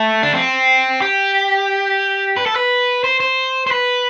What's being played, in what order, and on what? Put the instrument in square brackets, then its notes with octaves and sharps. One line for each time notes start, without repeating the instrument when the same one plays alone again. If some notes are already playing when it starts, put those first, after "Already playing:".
Already playing: [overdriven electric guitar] A3
D4
C4
G4
B4
A4
B4
C5
C5
C5
B4